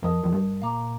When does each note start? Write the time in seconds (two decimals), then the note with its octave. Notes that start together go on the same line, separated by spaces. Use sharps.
0.02 F2 A#4 D#5 A5 D#6
0.24 F2
0.32 G2
0.62 A#2 F5 A#5 D6